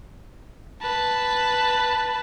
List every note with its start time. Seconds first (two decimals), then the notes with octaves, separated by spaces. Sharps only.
0.82 B4 A5